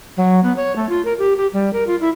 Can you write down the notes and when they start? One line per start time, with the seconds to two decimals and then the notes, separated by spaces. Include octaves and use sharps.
0.17 F#3
0.43 B3
0.56 C#5
0.76 A3
0.89 F4
1.05 A#4
1.19 G4
1.37 G4
1.53 G3
1.73 A#4
1.87 F4
2.01 E4